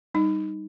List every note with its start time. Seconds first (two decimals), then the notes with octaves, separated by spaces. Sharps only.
0.14 G3 D#4